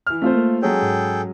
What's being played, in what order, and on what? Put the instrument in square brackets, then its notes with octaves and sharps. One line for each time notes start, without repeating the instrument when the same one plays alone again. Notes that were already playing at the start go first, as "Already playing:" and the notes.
[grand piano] E3 F6
[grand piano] A3 F4 C5 [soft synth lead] C4
[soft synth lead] A#3
[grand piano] F#3 G#3 C#4 [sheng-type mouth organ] G#4 A4 G5
[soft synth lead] G#2